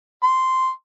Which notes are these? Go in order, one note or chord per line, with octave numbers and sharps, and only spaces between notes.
C6